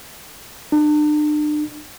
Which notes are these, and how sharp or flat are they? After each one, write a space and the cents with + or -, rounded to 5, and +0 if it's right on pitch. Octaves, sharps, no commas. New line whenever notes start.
D4 +40